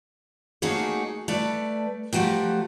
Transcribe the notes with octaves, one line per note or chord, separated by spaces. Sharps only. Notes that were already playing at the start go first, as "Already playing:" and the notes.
A3 A#3 D#4 F#4 G#4 C#5
A3 B4 D5 A5
F3 F#3 A3 F#4 G4